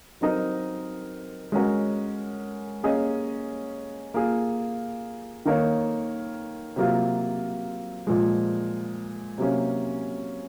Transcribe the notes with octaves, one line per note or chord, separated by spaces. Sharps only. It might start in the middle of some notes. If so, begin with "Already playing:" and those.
F#3 C4 D#4 A#4 D#5
G#3 C#4 F#4 A#4 C#5
A#3 C#4 G#4 D#5
A#3 F4 G#4
D#3 A#3 D#4 A#4 C#5
C3 F#3 A#3 F4
A#2 F3 G#3
C3 F#3 A#3 C#4